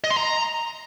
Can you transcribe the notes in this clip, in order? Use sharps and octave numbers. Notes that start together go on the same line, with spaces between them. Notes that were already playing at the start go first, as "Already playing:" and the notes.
D#5
C6
A#5